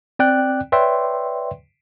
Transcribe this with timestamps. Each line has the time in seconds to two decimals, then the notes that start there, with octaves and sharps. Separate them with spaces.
0.19 C4 D5 G5 F#6
0.72 B4 C#5 D5 E5 G5 C6